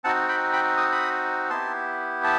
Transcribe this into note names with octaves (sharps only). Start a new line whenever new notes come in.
C4 D#4 F#4 F#5 A5
G5 B5
G5 B5
D#6
B5 D#6
B3 E4 G4 A5 C6
A5